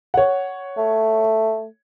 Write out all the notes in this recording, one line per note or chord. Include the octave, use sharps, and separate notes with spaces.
C#5 F#5
A3